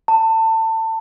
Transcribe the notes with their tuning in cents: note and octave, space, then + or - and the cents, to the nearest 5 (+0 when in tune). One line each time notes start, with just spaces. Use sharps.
A5 +25